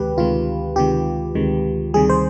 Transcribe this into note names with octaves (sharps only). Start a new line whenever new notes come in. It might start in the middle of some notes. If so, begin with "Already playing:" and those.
Already playing: D2 C3 D#3 G#3 G4 B4
D2 C3 D#3 G#3 F4
D2 C3 D#3 G#3 G4
D2 C3 D#3 G#3
D2 C3 D#3 G3 G#4
C5